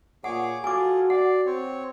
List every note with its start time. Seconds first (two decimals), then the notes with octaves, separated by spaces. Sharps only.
0.24 A#2 G#4 C#5 F#5 D6
0.64 F4 F#4 G#4 A4 G#5 D6
1.10 D5 F#5
1.46 C4 C#5